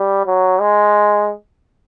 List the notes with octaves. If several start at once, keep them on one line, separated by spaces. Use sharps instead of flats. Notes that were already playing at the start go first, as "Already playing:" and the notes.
Already playing: G3
F#3
G#3